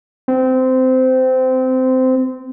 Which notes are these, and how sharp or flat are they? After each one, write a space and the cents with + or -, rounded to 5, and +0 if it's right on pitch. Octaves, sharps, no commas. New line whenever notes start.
C4 -20